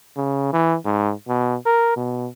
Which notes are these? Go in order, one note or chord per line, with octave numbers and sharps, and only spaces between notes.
C#3
E3
G#2
B2
A#4
B2